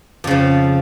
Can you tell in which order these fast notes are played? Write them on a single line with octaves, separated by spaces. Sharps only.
F2 C#3 F3